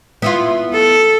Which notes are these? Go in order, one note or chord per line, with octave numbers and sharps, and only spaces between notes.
B3 E4 F4
A4